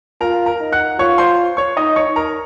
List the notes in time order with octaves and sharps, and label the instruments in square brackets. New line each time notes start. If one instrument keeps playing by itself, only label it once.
[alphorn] F4 [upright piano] A#4 A#5
[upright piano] A#4 A#5
[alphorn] D#4
[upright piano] F#5 F#6
[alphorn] F4 [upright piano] C#5 C#6
[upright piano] C5 C6
C#5 C#6
[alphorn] D#4 [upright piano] D#5 D#6
[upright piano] C#5 C#6
A#4 A#5